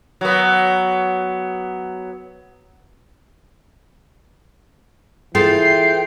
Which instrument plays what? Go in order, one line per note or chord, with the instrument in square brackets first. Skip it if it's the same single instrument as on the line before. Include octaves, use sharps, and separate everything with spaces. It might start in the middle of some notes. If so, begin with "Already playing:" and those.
[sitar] F#3 B3
[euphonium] E3 [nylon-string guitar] F4 G#4 A4 [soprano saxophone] G5 [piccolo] C7